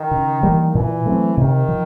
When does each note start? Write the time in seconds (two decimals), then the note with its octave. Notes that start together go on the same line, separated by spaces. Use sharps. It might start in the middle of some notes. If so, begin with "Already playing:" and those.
Already playing: D#3
0.11 C#3
0.43 E3 G3 A#3
0.75 A#2 E3
1.06 F#3 A3 C4
1.37 C3 D#3
1.68 F3